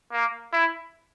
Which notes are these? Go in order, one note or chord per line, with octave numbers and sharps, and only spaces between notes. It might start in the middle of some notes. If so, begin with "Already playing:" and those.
A#3
E4